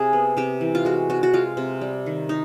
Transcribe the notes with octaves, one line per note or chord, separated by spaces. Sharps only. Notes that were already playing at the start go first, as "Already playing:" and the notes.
Already playing: C3 G#4
B3
C3 G4
E3
F4
G#3 F#4
C3 F#4
F#4
G#3 F4
C3
G3
D#3
D#4